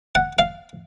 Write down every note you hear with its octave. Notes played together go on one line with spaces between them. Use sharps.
F#5
F5